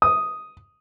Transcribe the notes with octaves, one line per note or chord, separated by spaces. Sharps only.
D#6